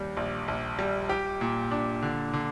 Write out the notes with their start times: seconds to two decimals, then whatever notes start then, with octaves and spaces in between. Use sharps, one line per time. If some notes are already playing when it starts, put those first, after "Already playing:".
Already playing: D#2 G3
0.17 A#1
0.48 A#1
0.79 G3
1.09 G4
1.41 A#2
1.71 D4
2.02 D3
2.33 D3